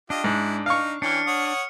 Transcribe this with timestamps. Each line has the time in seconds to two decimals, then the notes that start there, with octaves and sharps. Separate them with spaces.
0.10 D4 F4 G4 D#5
0.24 G#2 E4
0.66 D#4 F5 C#6
1.02 E3 C#4 D4 G5 F6 C#7
1.27 C#5 F#5 D#6